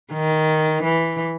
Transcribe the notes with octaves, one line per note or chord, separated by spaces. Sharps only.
D#3
E3